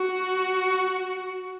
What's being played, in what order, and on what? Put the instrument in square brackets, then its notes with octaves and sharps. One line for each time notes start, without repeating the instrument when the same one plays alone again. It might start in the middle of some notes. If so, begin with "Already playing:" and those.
Already playing: [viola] F#4